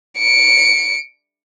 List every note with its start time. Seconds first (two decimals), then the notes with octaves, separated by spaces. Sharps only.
0.18 C#7 D7